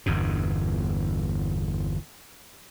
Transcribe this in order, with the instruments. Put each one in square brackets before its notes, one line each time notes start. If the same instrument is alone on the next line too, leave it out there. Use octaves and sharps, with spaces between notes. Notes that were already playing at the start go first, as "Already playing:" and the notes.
[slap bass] G1 E2 G2 B2